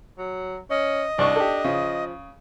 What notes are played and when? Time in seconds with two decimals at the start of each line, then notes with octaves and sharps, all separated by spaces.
0.18 F#3
0.70 C#4 D#5
1.18 C2 D4 D5 C#6
1.36 G4 A4
1.64 C#3 F3